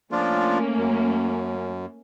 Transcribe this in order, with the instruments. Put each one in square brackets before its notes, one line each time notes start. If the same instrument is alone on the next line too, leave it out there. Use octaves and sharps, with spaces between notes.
[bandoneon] F3 D4 F4 [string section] A3 A#3 C#4
[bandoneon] F#2